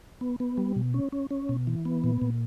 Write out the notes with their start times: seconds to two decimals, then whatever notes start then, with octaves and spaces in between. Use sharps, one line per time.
0.21 B3
0.40 B3
0.58 G3
0.76 B2
0.94 C#4
1.13 C#4
1.31 C#4
1.49 B2
1.67 E3
1.85 B3
2.04 A#2
2.22 A#2